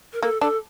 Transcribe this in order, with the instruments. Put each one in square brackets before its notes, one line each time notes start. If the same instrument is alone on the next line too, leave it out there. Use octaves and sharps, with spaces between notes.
[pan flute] A#4
[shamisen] A#3 [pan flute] A4
[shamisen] D4 [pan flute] A4